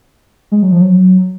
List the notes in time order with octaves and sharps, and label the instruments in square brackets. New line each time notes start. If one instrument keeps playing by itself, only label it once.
[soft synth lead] G#3
F#3
F3
F#3